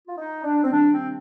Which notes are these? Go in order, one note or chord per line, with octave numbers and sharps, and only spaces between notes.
F4
D#4
D4
C4
C3 D#3 G3 D4
C4